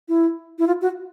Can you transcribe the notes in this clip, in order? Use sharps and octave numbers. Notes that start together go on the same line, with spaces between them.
E4
E4
F4
F#4